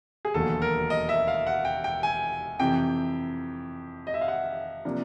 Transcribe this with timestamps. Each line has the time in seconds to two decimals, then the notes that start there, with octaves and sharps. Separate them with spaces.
0.25 G#4
0.34 E1 D#2 D3 F#3 A3 A4
0.62 A#4
0.90 D#5
1.09 E5
1.28 F5
1.47 F#5
1.65 G5
1.84 G5
2.03 G#5
2.59 F2 C3 E3 G5
4.07 D#5
4.14 E5
4.21 F5
4.28 F#5
4.85 C3 F3 A#3 D4